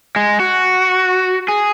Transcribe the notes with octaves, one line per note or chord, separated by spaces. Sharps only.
G#3
F#4
G#4